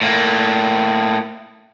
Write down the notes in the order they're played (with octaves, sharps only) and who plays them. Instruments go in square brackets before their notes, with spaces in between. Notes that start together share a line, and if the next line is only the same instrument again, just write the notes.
[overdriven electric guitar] A2 A#3